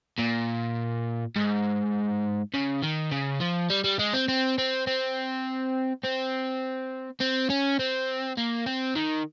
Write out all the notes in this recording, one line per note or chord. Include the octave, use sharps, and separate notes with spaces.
A#2
G#2
C#3
D#3
C#3
F3
G3
G3
G#3
C4
C4
C4
C4
C4
C4
C#4
C4
A#3
C4
D#3